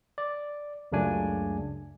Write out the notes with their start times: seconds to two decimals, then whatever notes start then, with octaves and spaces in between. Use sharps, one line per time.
0.18 D5
0.92 C#2 F#2 C#3 A3 D4 G#5